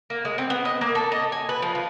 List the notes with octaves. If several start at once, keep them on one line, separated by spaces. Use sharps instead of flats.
A#3
G#3
C4
B3
D#5
A#3
A4
D#5
G#5
B4
F3
F4